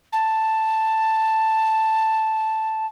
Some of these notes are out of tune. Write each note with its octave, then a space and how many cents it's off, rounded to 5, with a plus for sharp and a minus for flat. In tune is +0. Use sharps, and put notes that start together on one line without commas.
A5 +5